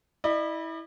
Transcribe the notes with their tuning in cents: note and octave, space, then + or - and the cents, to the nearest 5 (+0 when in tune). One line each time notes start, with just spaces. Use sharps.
E4 -20 D5 +45